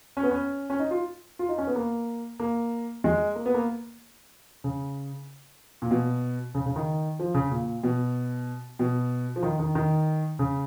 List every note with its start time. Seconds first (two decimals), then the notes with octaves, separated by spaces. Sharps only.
0.17 C#4
0.23 B3
0.31 C#4
0.70 C#4
0.80 D#4
0.91 F4
1.39 F4
1.49 D#4
1.58 C#4
1.67 B3
1.76 A#3
2.40 A#3
3.04 G#3
3.35 A#3
3.46 B3
3.54 A#3
4.64 C#3
5.82 A#2
5.91 B2
6.55 C#3
6.66 C#3
6.76 D#3
7.19 F3
7.34 C#3
7.51 A#2
7.83 B2
8.79 B2
9.36 F3
9.43 D#3
9.59 D#3
9.75 D#3
10.39 C#3